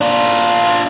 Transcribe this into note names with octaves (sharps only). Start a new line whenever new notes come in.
D4 F4